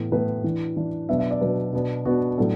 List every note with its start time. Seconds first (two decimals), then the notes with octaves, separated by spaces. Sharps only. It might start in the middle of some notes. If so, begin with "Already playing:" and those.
Already playing: A2 E3 B3
0.12 A2 E3 B3 B4
0.44 E3 D4
0.77 E3 D4
1.09 B2 F#3 B3 D4 E5
1.19 E5
1.31 D5
1.41 B2 F#3 B3 D4 B4
1.73 B2 B3 D4
2.05 B2 B3 D4 F#4
2.38 A2 F#3 B3 D4 A4